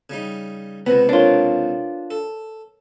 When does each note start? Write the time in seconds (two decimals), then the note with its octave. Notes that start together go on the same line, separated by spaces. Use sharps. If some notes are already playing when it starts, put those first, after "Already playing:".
0.10 C#3 G3 D#4
0.86 C#2 C3 B3 B4 A#6
1.09 D4 F4 A#4 C5 C#5
2.11 A4